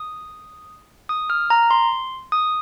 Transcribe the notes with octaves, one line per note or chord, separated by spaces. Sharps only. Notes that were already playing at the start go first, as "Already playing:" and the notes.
Already playing: D#6
D#6
F6
A#5
C6
D#6